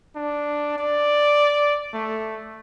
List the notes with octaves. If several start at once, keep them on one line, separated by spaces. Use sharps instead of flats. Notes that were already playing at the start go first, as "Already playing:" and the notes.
D4
D5
A3